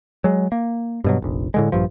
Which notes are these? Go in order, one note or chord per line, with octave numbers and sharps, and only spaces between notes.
F#3 G#3
A#3
G2 B2 F#3
F1 A#1
A2 D3 G#3
A#1 G2 F3